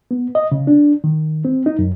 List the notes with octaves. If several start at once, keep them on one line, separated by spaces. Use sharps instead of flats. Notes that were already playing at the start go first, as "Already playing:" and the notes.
B3
D#5
C#3
D4
D#3
C4
D#4
F#2